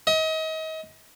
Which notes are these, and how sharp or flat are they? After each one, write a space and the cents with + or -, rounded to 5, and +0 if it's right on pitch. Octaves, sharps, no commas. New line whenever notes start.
D#5 +35